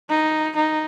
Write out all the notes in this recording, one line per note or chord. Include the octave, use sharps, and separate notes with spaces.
D#4
D#4